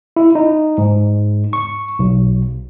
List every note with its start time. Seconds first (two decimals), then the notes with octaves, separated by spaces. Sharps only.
0.16 E4
0.35 D#4
0.78 G#2
1.53 C#6
1.99 B1